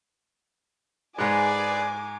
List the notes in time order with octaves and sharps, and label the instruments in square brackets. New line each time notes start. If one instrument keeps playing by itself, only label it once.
[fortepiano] G#2 G#3 [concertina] G#4 B4 [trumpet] D5 [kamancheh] G#5 D6